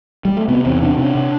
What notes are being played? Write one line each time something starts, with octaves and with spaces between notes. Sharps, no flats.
G3
A3
C3 B3
E2 C4
C3 D4
C3 D4
C3